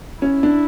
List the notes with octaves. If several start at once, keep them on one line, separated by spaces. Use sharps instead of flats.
C#4 E4
D4